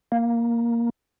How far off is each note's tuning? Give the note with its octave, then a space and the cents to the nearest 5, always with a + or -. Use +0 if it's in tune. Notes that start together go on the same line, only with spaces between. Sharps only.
A#3 +5